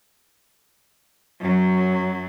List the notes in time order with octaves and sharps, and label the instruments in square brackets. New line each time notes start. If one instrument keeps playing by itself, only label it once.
[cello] F#2 F#3